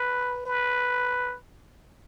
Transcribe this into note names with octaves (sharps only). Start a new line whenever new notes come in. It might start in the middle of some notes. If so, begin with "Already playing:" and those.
Already playing: B4
B4